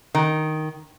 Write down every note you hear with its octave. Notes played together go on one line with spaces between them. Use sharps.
D#3